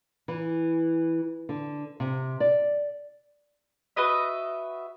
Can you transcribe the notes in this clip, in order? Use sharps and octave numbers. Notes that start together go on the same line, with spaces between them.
E3
D3
C3
D5
F#4 B4 D#5 E5